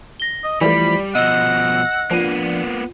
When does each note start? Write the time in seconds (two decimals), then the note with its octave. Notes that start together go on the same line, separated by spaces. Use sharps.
0.20 A#6 G7
0.44 D#5
0.61 E3 F3 G3 A3 D5 B5
1.15 B2 F3 D#5 F#5 E6 A#6
2.11 F3 A#3 B3 D4 F4 D#7